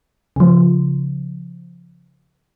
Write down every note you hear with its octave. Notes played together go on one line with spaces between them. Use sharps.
C#3 F3